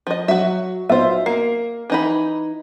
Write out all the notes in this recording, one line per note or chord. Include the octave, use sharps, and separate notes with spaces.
F3 D#5
F#3 F#4 E5
B1 B3 F4 C5 E5
A#3 C7
E3 D#4 B5